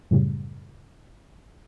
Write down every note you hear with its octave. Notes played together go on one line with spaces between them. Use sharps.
F#2 A2 C#3 G3